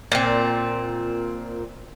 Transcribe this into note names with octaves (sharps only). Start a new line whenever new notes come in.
A#2 C4